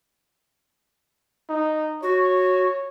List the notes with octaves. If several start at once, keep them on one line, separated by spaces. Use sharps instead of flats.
D#4
F#4 C#5